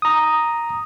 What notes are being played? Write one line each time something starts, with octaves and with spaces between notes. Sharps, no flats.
A#5 D#6